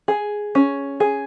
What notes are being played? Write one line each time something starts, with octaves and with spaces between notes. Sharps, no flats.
G#4
C#4
G#4